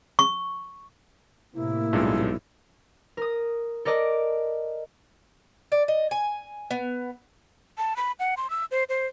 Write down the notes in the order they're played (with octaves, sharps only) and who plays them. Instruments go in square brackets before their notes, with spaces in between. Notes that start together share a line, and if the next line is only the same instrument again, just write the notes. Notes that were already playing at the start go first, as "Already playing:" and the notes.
[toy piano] C#6
[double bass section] A2 C3 A#3 [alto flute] E4
[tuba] B1 [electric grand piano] G2 A#2 G#3
[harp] A#4 D#6
A4 A#4 D5 D#5
[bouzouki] D5
D#5
G#5
B3
[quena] A5
B5
F#5
C6
E6
C5
C5